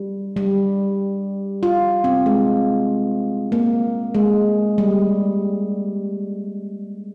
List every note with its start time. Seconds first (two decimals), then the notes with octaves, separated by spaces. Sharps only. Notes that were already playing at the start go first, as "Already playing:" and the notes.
Already playing: G3
0.37 G3
1.63 F4
2.04 C4
2.26 G#3
3.52 A#3
4.15 G#3
4.78 G3